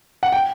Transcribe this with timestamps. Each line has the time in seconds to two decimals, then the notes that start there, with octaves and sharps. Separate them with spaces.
0.23 F#5
0.32 G5